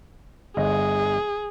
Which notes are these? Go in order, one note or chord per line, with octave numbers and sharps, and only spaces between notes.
G1 G#4 D#5